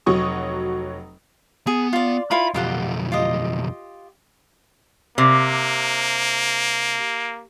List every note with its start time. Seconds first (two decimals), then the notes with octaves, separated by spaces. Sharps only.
0.06 F1 F#3 C#6 D#6
1.67 B3 G#4
1.93 F4 D5
2.31 E4 F4 A#4 B5
2.54 B1 F2 F4 G4 F#5
3.12 F4 G4 D#5
5.18 C3 A#3